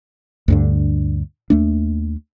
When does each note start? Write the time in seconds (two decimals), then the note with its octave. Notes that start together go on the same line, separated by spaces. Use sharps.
0.48 D2 G2 D3
1.50 D#2 A3 D4